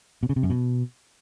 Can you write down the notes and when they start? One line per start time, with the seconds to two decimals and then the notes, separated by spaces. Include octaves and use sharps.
0.23 B2
0.29 C#3
0.36 C3
0.43 F#2
0.50 B2